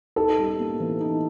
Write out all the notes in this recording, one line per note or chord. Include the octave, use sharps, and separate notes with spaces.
D#4 A4
G3
A#3
E3
D#4